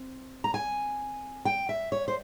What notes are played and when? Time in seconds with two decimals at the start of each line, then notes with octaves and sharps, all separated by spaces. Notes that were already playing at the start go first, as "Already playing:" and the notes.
Already playing: C4
0.44 A#5
0.54 G#5
1.45 G5
1.69 E5
1.92 C#5
2.08 C5